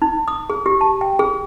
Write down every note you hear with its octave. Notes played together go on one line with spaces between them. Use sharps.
D#4
D#6
G#4
G4
A5
G5
G#4